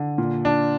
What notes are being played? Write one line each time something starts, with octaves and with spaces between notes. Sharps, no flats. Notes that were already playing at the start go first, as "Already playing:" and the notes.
Already playing: D3
A#2
D4